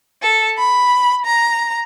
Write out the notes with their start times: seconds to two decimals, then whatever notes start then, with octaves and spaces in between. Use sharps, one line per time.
0.21 A4
0.58 B5
1.25 A#5